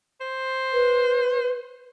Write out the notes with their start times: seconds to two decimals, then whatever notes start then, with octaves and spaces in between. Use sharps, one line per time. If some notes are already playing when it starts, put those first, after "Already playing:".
0.21 C5
0.73 B4